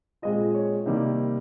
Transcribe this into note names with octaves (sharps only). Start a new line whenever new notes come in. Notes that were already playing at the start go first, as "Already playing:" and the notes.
A#2 G#3 C4 F4 D#5
C#5
C3 D#3 G3 A#3 D#4